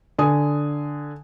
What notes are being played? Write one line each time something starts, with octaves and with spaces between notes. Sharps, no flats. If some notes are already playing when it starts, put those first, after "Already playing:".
D3 G#5 D#6